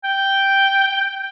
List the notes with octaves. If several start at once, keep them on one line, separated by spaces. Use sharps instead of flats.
G5